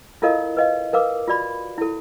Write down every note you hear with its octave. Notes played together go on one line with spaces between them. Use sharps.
E4 F4 A4 A#4 D#5 F5
B4 D#5 F5
A#4 B4 F5 D6
F4 F#4 D5 B5
E4 A4